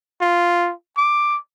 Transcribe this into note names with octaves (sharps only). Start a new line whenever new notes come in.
F4
D6